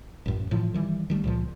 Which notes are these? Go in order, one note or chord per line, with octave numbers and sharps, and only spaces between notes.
A1 F#2
A2 E3 F3
D#3 E3 G3
D#3 G3 A3
C#2 A#2 F3